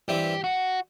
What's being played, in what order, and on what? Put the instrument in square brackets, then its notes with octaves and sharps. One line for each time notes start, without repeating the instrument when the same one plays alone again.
[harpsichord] G2 E3 G3 C4 E4 [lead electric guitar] G4
[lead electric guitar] F#4